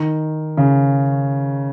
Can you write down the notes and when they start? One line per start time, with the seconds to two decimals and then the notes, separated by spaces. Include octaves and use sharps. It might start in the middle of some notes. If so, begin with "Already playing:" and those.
Already playing: D#3
0.57 C#3